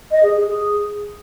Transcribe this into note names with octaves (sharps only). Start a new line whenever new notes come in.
D#5
G#4
G#4
G#4